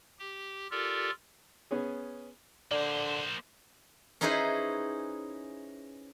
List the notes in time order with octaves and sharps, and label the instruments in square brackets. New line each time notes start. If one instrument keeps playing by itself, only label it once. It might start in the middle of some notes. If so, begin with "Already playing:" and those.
[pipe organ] G4
F4 G4 A4 A#4 D5
[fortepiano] B3 C#4 G#4
[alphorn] D3 [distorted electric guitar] A#3 C5 [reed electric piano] D5
[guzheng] C#4 D#4 E4 G#4 B4 C5